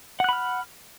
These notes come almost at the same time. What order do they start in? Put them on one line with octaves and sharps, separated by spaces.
F#5 F#6 B5 F6